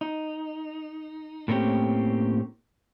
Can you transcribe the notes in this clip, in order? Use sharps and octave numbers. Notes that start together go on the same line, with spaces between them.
D#4
A2 A3 A#3 C4 C#4 G4